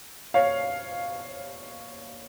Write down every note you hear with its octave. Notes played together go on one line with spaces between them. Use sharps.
C#5 F5